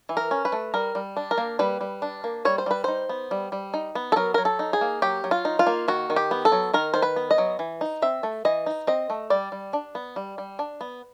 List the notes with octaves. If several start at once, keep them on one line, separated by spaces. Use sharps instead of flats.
E3
A#4
C#4
B4
A3
G3 A#4
G3
D4
A#4
A#3
G3 B4
G3
D4
A#3
G3 C#5
C5
G3 B4
D#4 C5
B3
G3
G3
D#4
B3
A4
F#3 A#4
F#3 A#4
A4
D#4
G#4
A#3
F#3 G4
F#3
F4
D#4
F4
A#3
D#3 F#4
D#3
G4
B3
A4
F#3
D#3 A#4
D#3 C5
B4
B3
D#5
F#3
E3
D#4
C4 E5
A3
E3 D#5
D#4
C4 D#5
A3
G3 D5
G3
D4
B3
G3
G3
D4
B3